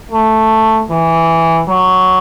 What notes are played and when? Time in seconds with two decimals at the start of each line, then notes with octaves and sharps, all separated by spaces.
0.11 A3
0.90 E3
1.68 F#3